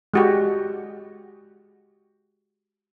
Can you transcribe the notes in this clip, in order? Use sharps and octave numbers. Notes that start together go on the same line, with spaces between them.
G#3 F#4 G4